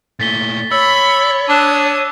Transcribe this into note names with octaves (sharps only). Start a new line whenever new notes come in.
A#2 A3 A6 B6 G7
C#5 B5 E6
D4 D6 D#6 F#6 E7